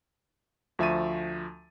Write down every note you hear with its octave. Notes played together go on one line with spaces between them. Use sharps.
D2 F3 E5 C#6 A6 D#7